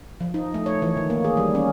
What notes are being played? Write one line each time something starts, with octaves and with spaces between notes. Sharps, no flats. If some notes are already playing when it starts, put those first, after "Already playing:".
F3
D#4
A3
C#5
E3
D#3
A#3
G#4
G3
C#4